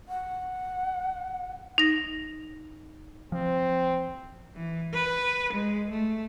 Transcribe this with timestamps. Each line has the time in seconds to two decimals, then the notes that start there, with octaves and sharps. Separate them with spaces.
0.09 F#5
1.78 D#4 A#6
3.32 F3 C4
4.56 E3
4.93 B4
5.53 G#3
5.90 A3